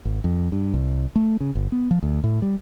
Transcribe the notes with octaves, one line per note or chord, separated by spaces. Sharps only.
G#1
F2
G2
C2
A3
C#3
G1
B3
F3
D2
A2
G3